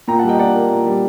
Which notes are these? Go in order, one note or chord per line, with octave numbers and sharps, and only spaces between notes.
A#2 G5 A#5
F#5 A5
G3
D#5 G5
A#2 D5 F#5
A#3
A#2
G3